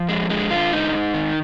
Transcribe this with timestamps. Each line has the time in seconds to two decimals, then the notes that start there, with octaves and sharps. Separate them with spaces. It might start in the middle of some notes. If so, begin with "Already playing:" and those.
Already playing: F3
0.09 F2 G#3
0.30 D3 G#3
0.51 D3 F4
0.71 G#2 D#4
0.93 G#2
1.14 D#3